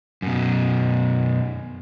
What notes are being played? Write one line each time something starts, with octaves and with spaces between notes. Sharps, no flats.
F#2 B2